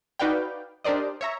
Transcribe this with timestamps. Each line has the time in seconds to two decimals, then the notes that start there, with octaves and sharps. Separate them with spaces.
0.20 D#4 F#4 B4 D5 F5 G5
0.84 D4 G4 A#4 C5 D5 D#5
1.21 C#5 E5 A#5